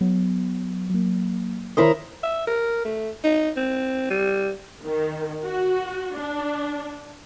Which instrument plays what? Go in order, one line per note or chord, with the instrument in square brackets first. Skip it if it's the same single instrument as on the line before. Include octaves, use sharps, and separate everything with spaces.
[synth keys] F#3 B3
F#3 A#3
[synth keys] D#3 C#5 D#6 [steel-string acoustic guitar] E4 A#4 C5
[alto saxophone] E5
A#4
A3
D#4
C4
G3
[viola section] D#3
F#4
D4